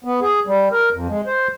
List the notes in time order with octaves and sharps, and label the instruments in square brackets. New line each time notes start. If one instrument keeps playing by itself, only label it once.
[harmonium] B3
G#4
G3
A#4
F2
G#3
C5